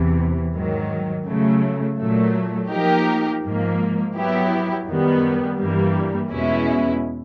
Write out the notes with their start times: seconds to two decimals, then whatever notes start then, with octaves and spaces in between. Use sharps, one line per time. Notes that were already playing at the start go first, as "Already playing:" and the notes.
Already playing: E2 C3 E3
0.54 G#2 D#3 F#3
1.26 C#3 F#3 A3
1.99 A#2 F#3 A3
2.70 F3 A#3 D#4 G4 A#4
3.42 G#2 F3 A#3
4.15 F#3 B3 E4 G4
4.86 F#2 D#3 G3 B3
5.58 G2 E3 G3 A#3
6.31 E2 B2 G#3 C#4 E4